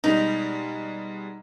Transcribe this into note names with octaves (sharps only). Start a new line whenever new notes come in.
B2 G3 G#3 D#4